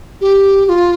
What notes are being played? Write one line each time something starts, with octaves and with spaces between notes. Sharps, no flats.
G4
G4
F4